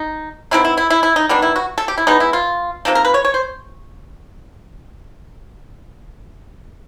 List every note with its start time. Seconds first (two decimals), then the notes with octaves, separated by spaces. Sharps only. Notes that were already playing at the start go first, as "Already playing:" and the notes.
Already playing: D#4
0.51 B2 G#3 C4 D#4 E4
0.65 E4
0.77 E4
0.90 E4
1.03 E4
1.16 D#4
1.29 D#3 G3 B3 D4
1.42 E4
1.56 F#4
1.78 A4
1.88 G4
1.98 E4
2.07 E3 G#3 B3 D#4
2.20 E4
2.33 F4
2.85 C3 F3 A#3 D#4 A4
2.95 A#4
3.05 B4
3.14 C#5
3.25 C#5
3.34 C5